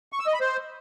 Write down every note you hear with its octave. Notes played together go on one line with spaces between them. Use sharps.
C#6
E6
D#5
B5
C5